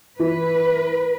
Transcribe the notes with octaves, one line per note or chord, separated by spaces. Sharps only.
E3 B4